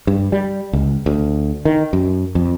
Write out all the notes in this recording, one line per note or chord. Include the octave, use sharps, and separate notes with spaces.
G2
G3
C#2
D2
D#3
F#2
F2